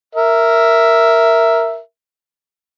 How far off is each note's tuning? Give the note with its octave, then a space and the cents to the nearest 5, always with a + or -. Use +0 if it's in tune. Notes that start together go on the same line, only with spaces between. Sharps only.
A#4 -5 E5 +0